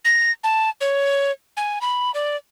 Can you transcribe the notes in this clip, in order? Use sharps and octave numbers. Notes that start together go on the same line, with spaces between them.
A#6
A5
C#5
G#5
B5
D5